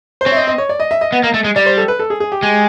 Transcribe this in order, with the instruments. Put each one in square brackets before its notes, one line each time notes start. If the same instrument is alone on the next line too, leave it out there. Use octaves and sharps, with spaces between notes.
[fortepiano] C5
[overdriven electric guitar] C4 [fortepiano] C#5
[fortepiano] E5
D#5
D#5
C#5
D5
D#5
E5
D#5
[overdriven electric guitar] B3
A#3
A3
G#3
[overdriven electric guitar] G3 [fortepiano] D5
[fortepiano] C5
A4
B4
A4
G#4
G#4
G4
[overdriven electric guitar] G#3